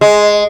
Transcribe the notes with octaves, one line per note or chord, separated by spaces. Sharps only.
G#3